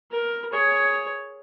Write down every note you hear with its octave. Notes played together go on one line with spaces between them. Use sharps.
A#4
G#4 C#5